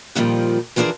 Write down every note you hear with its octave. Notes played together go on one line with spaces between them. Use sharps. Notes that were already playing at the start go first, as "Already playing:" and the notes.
F2 A#2 D#3 F3 G3
E3 F3 D4 G#4 A#4 C5